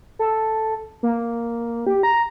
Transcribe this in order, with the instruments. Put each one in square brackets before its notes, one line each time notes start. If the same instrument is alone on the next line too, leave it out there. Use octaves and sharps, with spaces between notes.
[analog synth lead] A4
A#3
G4
A#5